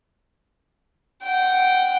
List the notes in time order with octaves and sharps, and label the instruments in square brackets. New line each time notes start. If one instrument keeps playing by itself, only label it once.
[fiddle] F#5 G5